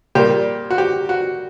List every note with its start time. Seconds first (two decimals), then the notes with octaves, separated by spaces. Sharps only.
0.15 A#2 G3 A#3 G4
0.70 F#4
0.78 G4
1.09 F#4